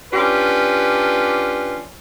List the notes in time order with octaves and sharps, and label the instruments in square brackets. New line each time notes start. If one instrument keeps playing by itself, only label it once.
[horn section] C#4 D4 F4 G4 B4